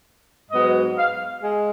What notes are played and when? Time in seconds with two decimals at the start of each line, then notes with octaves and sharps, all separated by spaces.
0.51 G#2 F#3 B3 D#5
0.97 F5
1.42 G#3